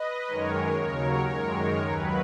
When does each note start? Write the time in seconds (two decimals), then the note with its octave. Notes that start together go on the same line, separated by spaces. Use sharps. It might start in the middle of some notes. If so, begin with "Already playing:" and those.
Already playing: B4 D#5
0.27 F#2 D#3 G#3 A#4 C#5
0.81 D#2 C#3 F#3 A#4 C#5
1.33 F#2 D#3 G#3
1.87 D#2 D#3 F#3 B4